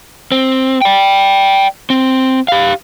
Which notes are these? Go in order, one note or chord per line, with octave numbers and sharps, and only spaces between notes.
C4
D5 G5
C4
G4 F5